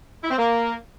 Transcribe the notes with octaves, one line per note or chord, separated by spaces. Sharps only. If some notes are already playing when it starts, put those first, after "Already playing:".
E4
C4
A#3